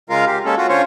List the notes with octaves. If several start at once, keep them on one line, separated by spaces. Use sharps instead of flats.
C#3 G#3 F4 A#4 F5
G4
G#3 A#3 C#4 A4
F4 F#4
D3 C#4 F4 C5 C#5